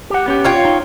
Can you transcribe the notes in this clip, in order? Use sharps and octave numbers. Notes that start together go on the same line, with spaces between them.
G4 F#5
B3 C#4 G4
F4 C#5 G5
D#4